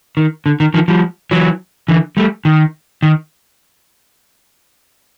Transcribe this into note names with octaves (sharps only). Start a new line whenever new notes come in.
D#3
D3
D#3
D#3 F3
F3 G3
E3 F#3
D3 E3
G3 A3
D#3
D#3